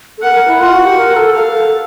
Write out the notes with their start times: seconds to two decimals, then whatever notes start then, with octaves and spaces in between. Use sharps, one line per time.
0.18 A4
0.22 A#4 F#5
0.35 A#4
0.48 E4
0.60 F4 F#5
0.73 F#4
0.85 G4
0.97 A#4
1.16 A4
1.34 A4 F5
1.48 A#4
1.54 A4